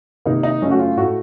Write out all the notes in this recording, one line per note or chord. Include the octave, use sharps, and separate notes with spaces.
C3 D#3 A#3 D#4
D#4
F#2 C#3 A3 C#4
F#4
F4
A2 A3 F#4